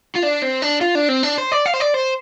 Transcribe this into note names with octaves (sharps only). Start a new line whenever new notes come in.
F4
D4
C4
D4
F4
D4
C4
D4
C5
D5
F5
C5
D5
C5